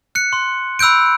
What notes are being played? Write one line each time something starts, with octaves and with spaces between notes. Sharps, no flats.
F#6 C#7
C6
B5 E6 F#6 G6 D7